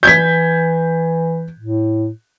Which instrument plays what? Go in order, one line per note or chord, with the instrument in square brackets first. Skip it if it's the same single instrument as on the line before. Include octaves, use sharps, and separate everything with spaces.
[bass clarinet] E3 [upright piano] G6 G#6 B6
[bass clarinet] A2